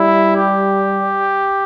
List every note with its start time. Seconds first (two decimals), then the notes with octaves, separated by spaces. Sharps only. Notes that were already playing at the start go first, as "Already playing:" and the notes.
Already playing: G3 E4
0.36 G4